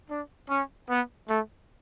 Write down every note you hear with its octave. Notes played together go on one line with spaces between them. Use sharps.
D4
C#4
B3
A3